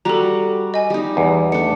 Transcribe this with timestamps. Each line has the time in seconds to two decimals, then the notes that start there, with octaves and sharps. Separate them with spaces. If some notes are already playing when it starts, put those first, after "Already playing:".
0.05 G3 F#4 A4 A#5
0.74 D#5 G#5
0.90 G3 D#4
1.17 E2
1.52 A3 D4 C#7